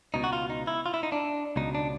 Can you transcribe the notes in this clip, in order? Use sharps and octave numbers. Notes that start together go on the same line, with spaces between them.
C#2 B2 D#4
F#4
F4
D#4
E4
F4
E4
D#4
D4
C#2 B2 D#4
D4